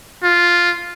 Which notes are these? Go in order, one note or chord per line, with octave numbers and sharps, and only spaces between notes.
F4